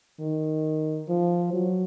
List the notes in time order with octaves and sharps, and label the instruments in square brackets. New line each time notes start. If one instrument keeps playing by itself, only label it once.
[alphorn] D#3
F3
F#3